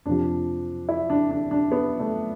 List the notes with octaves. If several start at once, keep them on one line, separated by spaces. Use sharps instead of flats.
F2 C3 F3 D4
E4
D4
D4
D4
B3
A3